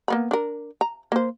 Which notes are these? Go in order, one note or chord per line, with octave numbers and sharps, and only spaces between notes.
A#3 B3 B5
D4 A#4
A#5
A#3 C5